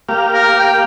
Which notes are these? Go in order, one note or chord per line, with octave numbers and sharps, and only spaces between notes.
A#3 G4 F5
A#4
G5